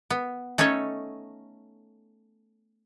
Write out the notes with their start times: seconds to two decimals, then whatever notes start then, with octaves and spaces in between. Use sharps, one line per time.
0.10 B3
0.58 A3 C#4 D#4 A4 C#5